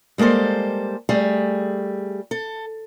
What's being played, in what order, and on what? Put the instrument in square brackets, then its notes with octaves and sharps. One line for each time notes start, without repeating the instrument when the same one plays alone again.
[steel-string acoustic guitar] G3 G#3 A#3 A4 C5
G3 A3 G#4
A4